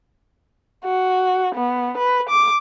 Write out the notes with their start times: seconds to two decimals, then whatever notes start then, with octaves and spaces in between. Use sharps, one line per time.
0.84 F#4
1.55 B3
1.98 B4
2.30 D6